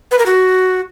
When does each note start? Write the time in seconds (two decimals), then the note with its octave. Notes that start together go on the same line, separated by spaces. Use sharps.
0.11 B4
0.19 A#4
0.26 F#4